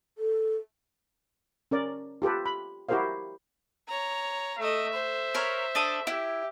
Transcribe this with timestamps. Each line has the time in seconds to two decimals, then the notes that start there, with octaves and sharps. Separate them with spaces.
0.18 A4
1.71 C#4 A#4 D5
2.22 F4 G4 A4 B4
2.46 B5
2.89 E4 F#4 G4 A#4 C5 F5
3.88 C#5 A#5
4.58 A3 D#5 E5
4.93 C5
5.34 A#4 C#5 B5
5.75 D4 A4 D#6
6.07 E4 G4